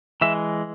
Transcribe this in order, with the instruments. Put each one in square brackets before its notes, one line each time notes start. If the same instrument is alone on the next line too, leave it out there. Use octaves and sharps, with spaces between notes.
[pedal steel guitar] E3 G#3 E5